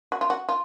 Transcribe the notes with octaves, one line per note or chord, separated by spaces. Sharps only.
F#4
F4
F#4
F4